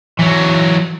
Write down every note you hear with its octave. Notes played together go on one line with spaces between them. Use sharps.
E3 F#3